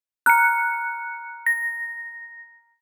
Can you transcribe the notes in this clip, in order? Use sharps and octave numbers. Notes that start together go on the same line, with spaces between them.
A#5 F6 F#6 C#7
A#6